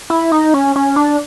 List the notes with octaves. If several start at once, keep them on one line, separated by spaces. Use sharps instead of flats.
E4
D#4
C#4
C#4
D4